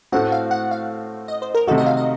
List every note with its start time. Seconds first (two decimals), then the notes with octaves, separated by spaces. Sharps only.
0.12 A2 A3 C4 F#4 F#5
0.32 F5
0.51 F#5
0.71 F5
1.28 D#5
1.42 C5
1.55 A#4
1.67 C3 D#3 A3 D#4 F#4 A4
1.78 D#5
1.86 F5
1.97 D#5